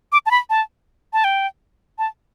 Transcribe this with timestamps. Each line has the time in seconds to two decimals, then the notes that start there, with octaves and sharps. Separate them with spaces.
0.12 D6
0.26 A5
0.31 B5
0.50 A5
1.13 A5
1.24 G5
1.98 A5